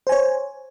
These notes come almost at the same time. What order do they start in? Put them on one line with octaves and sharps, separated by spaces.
C5 G#5 C#5